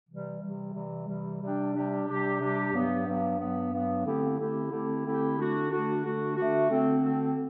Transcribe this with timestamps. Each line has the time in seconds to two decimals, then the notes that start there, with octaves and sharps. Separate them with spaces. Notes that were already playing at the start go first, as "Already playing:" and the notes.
0.08 C3 E3 G3
0.41 C3 E3 G3
0.74 C3 E3 G3
1.07 C3 E3 G3
1.41 C3 G3 D4 G4
1.73 C3 G3 D4 G4
2.06 C3 G3 D4 G4
2.40 C3 G3 D4 G4
2.73 G2 F#3 B3
3.05 G2 F#3 B3
3.39 G2 F#3 B3
3.72 G2 F#3 B3
4.05 D3 A3 C4 E4 G4
4.38 D3 A3 C4 E4 G4
4.71 D3 A3 C4 E4 G4
5.05 D3 A3 C4 E4 G4
5.37 D3 A3 D4 F#4
5.70 D3 A3 D4 F#4
6.03 D3 A3 D4 F#4
6.36 D3 A3 D4 F#4
6.70 D3 A3 C4
7.02 D3 A3 C4